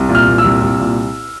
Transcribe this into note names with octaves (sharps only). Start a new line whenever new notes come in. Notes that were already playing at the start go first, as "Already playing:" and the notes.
Already playing: C2
A#2
F6
A#2
E6
C2
C2
A#2